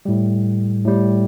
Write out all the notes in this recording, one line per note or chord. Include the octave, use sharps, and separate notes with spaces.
A2 G3
A2 G3